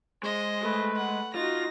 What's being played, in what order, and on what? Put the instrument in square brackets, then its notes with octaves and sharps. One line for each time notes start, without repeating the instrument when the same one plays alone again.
[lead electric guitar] G#3 [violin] C5 D#5
[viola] A3 B4
[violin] F#5
[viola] D#4 F#4 [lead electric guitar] F4 [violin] A#6